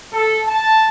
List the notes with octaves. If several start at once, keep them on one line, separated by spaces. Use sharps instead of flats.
A4
A5